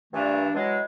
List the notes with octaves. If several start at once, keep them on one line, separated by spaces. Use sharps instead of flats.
G2 A#2 E3 A3 D4
E3 F#3 G#3